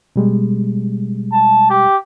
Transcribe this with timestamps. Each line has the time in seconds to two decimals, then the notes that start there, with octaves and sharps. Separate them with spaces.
0.16 B2 G3 G#3
1.32 A5
1.70 G4